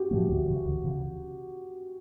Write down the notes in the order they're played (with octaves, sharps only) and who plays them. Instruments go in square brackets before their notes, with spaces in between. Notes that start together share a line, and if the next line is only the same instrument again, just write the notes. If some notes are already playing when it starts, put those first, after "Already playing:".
Already playing: [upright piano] F#4 G4
[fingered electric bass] A2 F3 A3
D2
C#3 E3
D2
C#3 E3